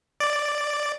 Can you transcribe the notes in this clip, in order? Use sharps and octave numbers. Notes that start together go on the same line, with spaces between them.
D5